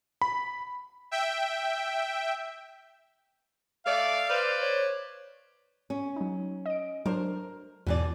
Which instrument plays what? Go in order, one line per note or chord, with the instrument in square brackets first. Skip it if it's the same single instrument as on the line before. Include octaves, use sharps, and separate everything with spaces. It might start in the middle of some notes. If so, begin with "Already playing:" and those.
[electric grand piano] B5
[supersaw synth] E5 G5
[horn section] A3 D5 [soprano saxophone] F5
[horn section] B4 C5 D5
[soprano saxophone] C#5
[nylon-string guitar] C#4
[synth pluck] F#3 D#4
D#5 D7
[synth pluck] F#3 D4 C5 [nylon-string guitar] A#4
[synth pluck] E2 [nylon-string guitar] B2 E3 D5